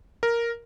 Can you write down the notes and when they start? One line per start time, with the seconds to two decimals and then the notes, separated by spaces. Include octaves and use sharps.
0.23 A#4